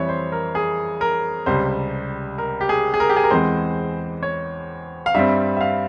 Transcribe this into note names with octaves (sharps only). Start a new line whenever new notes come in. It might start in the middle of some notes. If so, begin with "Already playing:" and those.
Already playing: F2 E3 G3 C4 C#5 E5
C5
A#4
G#4
A#4
C#2 C3 G3 C5
A#4
G4
G#4
G#4
A#4
G4
G#4
A#4
E2 E3 G#3 C4 C5
C#5
F5
G2 G3 C4 E5
E5
F5